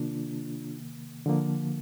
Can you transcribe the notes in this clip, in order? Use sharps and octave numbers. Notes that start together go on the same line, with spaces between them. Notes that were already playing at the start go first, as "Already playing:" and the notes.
Already playing: C3 D#3 A#3 D4 F4
D3 F3 A#3